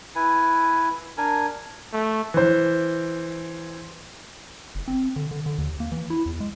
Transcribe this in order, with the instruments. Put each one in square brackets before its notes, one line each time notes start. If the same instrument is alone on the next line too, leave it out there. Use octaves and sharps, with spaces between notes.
[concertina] E4 B4 G#5
D4 A#4 G#5
[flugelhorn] A3
[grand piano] E3 C5
[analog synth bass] F#1
C4
D3
D3
D3
D#2
A#3
E3
E4
E2
G#3